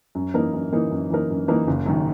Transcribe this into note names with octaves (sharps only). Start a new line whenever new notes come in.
F#2
E3 A#3 D#4 A#4
F#2
E3 A#3 D#4 A#4
F#2
E3 A#3 D#4 A#4
F#2
E3 A#3 D#4 A#4
F#1
F#2 D#3